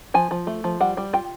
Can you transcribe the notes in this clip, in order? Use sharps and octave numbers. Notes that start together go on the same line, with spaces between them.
F3 G#5
F3
A3
F3
G3 F#5
G3
F4 G5